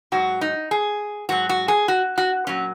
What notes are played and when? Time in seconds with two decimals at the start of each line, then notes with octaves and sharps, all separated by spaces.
0.12 G#2 F#3 F#4
0.41 D#4
0.71 G#4
1.29 G#2 F#3 F#4
1.49 F#4
1.68 G#4
1.88 F#4
2.18 F#4
2.47 A#2 F#3 C#4